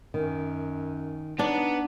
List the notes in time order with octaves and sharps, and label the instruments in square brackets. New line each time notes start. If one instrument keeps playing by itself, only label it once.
[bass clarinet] F#2 [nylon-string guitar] D#3
[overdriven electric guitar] B3 [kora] D4 [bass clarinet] D#4